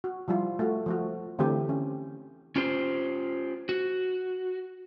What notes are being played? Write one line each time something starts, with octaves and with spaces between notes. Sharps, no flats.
F#4
F3 G3 E4 F4
A3 F#4
F3 A3 F#4
D3 E3 A3 C4 G4
C#4
C#4 F4 G4 C5
F#4